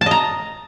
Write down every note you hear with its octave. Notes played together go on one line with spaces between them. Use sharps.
D#5 A5 A#5